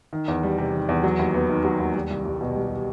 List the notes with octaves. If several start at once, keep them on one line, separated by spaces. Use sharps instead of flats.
D#3
E2
G3
C3
D#3
E2
F#3
D#2
B3
D#3
F#3
D#2
G3
C2
C2
B2
G3